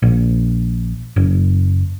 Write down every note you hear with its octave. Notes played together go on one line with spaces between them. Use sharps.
A#1
F#1